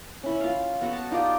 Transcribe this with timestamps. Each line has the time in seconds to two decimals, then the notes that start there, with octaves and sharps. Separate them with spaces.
0.23 C#4 E4
0.41 F4 F5
0.81 B3 F#4 A4
0.93 A5
1.11 D#4 F4 G4 D5